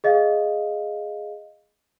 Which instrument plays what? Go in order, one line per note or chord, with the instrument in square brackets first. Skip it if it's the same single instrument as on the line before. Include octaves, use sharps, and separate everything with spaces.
[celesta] G#4 D#5 F5